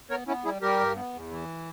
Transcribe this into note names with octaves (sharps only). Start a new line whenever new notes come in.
B3 A#4 C#5
B3 C#4 E4
G3 E4 G#4
G3 G4 A#4
G2
B3
E2
E3